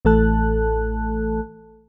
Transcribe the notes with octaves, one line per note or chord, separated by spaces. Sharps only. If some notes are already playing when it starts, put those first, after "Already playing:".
A1 E3 A3 A4 A5 F#6